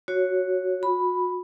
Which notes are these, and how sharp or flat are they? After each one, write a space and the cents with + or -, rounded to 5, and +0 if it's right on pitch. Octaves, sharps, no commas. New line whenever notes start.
F#4 +0 C#5 +0
F#4 -35 B5 +0